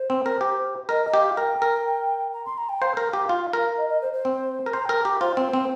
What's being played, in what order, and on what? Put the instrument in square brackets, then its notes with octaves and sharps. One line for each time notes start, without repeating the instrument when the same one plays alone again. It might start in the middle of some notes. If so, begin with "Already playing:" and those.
Already playing: [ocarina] C5
[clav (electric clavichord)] C4
A#4
G4
[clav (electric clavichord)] A#4 [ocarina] D#5
[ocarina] D#5
[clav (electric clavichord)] G4
[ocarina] F5
[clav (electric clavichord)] A#4 [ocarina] G5
[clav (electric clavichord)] A#4
[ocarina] A#5
C6
A#5
G5
[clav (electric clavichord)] C5 [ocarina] F5
[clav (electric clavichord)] A#4
G4
F4
A#4
[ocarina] D#5
D#5
C5
C5
[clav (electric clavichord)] C4
A#4
[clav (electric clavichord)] C5 [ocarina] A#5
[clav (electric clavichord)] A#4 [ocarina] G5
[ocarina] A#5
[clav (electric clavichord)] G4
[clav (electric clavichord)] F4 [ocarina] C5
[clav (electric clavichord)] C4
C4